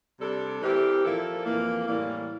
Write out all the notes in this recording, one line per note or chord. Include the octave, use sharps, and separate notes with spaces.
C3 G3 D4 A4
E3 A3 C4 G4 A#4
A#2 F3 A#3 E4 A4
F2 E3 A#3
A2 E3 G3 A#3